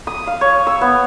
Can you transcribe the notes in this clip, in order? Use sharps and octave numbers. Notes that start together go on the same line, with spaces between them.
D#6
F5
C#5
E6
B3